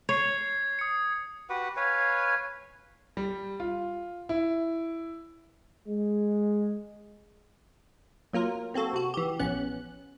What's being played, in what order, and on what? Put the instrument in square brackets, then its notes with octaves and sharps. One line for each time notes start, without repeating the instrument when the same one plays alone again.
[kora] C#5 [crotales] G#6 C7
[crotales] D#6 C#7
[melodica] F#4 G4 B4 F#5
B4 C#5 F5 G#5
[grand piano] G3
F4
E4
[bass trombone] G#3
[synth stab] F#3 A#3 F4 A#4
A#3 C4 F#4 A4
C3 F#4
E3 G4
A#1 B3 C#4 F#6